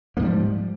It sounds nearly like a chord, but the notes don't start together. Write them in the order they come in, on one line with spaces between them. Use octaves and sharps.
A#3 G#2 G3 F3